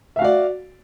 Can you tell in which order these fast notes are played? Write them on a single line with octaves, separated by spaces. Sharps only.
E5 F5 F#4 D5